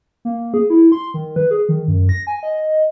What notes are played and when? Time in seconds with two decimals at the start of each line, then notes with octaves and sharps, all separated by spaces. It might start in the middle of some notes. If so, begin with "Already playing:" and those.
0.25 A#3
0.54 G#4
0.70 E4
0.92 C6
1.14 D#3
1.36 B4
1.51 G#4
1.69 D#3
1.88 F#2
2.09 A#6
2.27 G#5
2.43 D#5